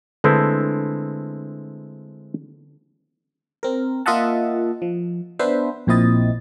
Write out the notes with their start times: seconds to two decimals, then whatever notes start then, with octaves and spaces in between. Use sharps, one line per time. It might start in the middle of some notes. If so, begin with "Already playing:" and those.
0.24 D3 G#3 C4 E4 A4 B4
3.63 C4 A#4
4.06 A#3 F4 D#5 E5 F#5 A5
4.82 F3
5.39 B3 D4 B4 C5 E5
5.87 A#1 A#2 C4 E4 D#5 A6